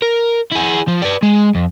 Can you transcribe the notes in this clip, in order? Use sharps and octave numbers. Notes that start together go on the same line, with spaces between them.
A#4
E4 G#4
F3
B4 D5
G#3
F2